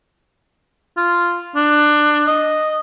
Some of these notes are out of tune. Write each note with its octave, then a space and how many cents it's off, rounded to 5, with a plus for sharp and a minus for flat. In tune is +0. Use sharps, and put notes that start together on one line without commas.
F4 -5
D4 +20
D#5 -5